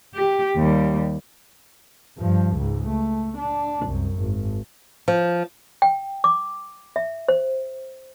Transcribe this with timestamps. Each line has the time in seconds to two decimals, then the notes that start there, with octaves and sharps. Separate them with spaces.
0.14 G4
0.56 D#2 G3
2.18 G2 F3
2.56 C#2 G#2
2.88 A3
3.38 D4
3.85 C2 F#2
4.19 G#1
5.08 F3
5.82 G5
6.24 D6
6.96 E5
7.29 C5